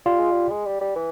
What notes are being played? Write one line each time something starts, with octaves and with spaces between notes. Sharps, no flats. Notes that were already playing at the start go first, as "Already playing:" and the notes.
G3 F4
G#3
G3
G#3
G3
G3
E3